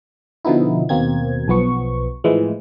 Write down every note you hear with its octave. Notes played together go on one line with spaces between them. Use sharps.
B2 D3 F3 B3 D#4 E4
D#2 B2 A#3 C4 G#6
B1 F3 B3 C#6
A2 E3 F3 G#3